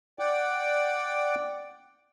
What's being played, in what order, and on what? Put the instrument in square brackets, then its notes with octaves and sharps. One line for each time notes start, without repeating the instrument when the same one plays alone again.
[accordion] D5 F#5 G5 D6